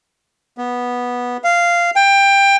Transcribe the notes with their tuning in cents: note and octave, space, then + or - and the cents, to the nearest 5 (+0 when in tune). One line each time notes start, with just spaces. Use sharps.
B3 -10
F5 -10
G5 +20